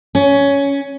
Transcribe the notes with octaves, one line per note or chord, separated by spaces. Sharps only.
C#4